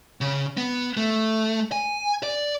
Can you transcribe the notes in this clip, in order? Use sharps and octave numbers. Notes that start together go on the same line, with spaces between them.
C#3
B3
A3
G#5
D5